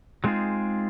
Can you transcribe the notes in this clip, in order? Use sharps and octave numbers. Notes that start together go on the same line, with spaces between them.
F#3 G#3 C4 D#4 F4 G#4